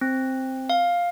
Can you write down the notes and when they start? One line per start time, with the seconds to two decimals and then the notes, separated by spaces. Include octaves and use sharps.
0.01 C4
0.70 F5